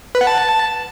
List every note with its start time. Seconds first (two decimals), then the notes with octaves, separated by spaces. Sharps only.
0.15 B4
0.21 F#5
0.27 A5